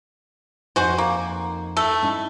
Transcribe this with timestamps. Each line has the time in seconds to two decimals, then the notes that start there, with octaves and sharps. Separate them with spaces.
0.76 F2 D#4 F#4 C5 G#5
0.98 A#3
1.77 A3 A4
2.02 C#4 D#4 E4